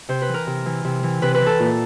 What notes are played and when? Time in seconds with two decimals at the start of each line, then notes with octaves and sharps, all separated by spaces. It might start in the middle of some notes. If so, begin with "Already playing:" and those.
0.09 C3 C5
0.22 B4
0.28 E3
0.34 A#4
0.47 C3
0.66 E3
0.85 C3
1.03 E3
1.22 C3 B4
1.35 B4
1.41 E3
1.46 A4
1.60 A#2